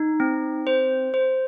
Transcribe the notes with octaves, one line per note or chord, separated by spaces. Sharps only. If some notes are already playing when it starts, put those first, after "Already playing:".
Already playing: D#4
C4
C5
C5